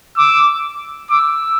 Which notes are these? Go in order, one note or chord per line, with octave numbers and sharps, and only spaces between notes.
D6 E6
D6 E6